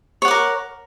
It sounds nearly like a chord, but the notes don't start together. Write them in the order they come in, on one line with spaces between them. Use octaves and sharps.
C#5 F#5 D6 A#4